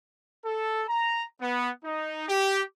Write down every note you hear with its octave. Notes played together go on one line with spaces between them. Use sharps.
A4
A#5
B3
D#4
G4